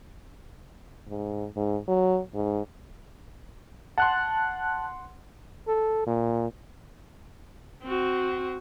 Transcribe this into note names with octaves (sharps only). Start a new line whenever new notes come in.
G#2
G#2
F#3
G#2
F#5 A5 C6 F#6
A4
A#2
C4 F#4